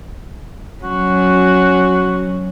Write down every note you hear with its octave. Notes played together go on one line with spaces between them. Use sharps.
F#3 C#4 F#4